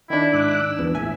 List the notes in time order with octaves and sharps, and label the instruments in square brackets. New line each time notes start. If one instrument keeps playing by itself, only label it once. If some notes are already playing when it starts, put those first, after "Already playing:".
[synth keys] D#3 D4 [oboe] E4
[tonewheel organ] G#2 D6 F#6 [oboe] E6
[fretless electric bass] E2 [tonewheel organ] E3 B3
[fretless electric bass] A#1 A2 [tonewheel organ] E5 [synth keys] G#5